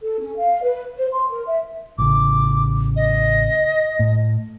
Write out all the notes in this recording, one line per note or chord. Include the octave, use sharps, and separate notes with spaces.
A4
C#4
F5
B4
C5
C6
A#4
E5
A1 C#3 D6
D#5
A2